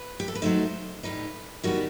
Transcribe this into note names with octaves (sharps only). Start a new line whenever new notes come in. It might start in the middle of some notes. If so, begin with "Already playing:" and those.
Already playing: B4
G4
A4
B4
F#3 A3 D#4 C5
A2 G3 D#4 B4
D#3 G3 B3 F#4